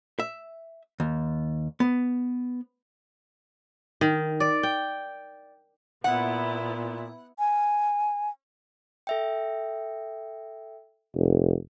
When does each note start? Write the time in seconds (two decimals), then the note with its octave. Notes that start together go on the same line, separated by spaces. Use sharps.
0.19 E5
1.00 D#2
1.80 B3
4.01 D#3
4.40 D5
4.63 G5
6.04 A#2 B3 E4 F#5
7.39 G#5
9.07 A4 E5 G5
11.15 F1